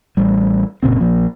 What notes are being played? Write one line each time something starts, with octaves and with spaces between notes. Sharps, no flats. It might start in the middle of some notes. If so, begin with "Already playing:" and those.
A1 G3
F#1 A#2 C#3 C4
A#1 F3 A#3